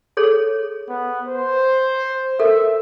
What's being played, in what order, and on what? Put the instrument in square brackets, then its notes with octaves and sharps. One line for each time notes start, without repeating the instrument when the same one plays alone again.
[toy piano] G#4 A4 C#5
[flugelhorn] B3
C5
[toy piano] A4 A#4 [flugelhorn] E5